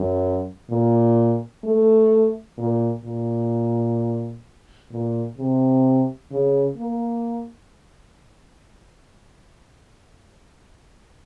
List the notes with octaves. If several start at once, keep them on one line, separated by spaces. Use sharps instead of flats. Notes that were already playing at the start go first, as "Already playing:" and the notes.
Already playing: F#2
A#2
A3
A#2
A#2
A#2
C3
C#3
A#3